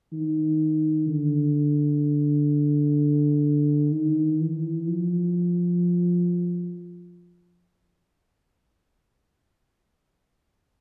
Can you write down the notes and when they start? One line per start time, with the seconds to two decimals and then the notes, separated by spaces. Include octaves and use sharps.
0.13 D#3
1.08 D3
3.92 D#3
4.40 E3
4.87 F3